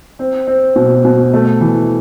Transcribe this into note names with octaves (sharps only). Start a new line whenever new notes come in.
C4
C4
B2
B2
A3
E3